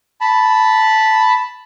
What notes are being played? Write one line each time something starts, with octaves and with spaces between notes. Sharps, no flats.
A5 B5